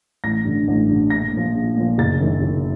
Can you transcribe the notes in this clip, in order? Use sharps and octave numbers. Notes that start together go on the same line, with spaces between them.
A1 A#6
G2 D3
A1
G2 D3
A#1 A#6
A#2 F3
A#1
A#2 F3
F#1 A6
F#2 D#3
F#1